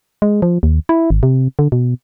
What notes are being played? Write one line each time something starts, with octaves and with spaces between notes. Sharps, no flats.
G#3
F3
D#2
E4
G#1
C3
D3
B2